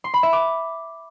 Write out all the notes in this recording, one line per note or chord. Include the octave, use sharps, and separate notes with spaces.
C6
B5
E5
D6